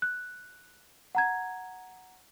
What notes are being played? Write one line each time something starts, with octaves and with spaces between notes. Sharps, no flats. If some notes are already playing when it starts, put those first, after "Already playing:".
F#6
F#5 A#5 G#6